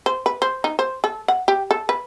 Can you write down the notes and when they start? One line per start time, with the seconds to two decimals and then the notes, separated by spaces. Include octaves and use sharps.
0.06 C5
0.26 B4
0.42 C5
0.64 D#4
0.79 C5
1.04 A4
1.28 F#5
1.48 G4
1.71 A4
1.89 B4